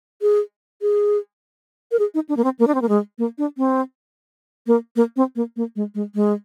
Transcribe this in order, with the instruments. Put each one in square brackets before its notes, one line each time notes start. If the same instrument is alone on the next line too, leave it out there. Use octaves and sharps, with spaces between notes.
[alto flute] G#4
G#4
A#4
G#4
D#4
D4
A#3
C4
A#3
D4
C4
A#3
G#3
A#3
D4
C4
A#3
A#3
C4
A#3
A#3
G#3
G#3
G#3